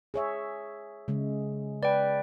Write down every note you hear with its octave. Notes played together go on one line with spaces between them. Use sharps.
G#4 C#5 E5
C#3 G#3
B4 D5 G5